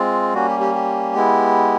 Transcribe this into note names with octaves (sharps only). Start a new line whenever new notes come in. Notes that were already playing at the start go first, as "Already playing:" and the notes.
Already playing: G#3 C4 F4
G3 A#3 C#4 F#4
G4
G4
G4
G#3 B3 E4